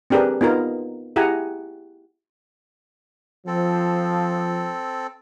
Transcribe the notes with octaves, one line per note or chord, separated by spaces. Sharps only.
C4 D4 G4 G#4 A#4 B4
B3 D#4 F4 A#4
E4 G4 G#4 F#5 G#5 A#5
F3 C4 A4